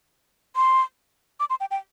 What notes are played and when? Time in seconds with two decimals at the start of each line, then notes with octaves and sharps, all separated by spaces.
0.56 C6
1.40 D6
1.50 C6
1.60 G5
1.71 G5